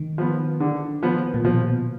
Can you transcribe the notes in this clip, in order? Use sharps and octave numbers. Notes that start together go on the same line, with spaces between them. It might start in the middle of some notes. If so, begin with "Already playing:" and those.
Already playing: D#3
F3 B3
D3
F3 B3
A#2
B2 F3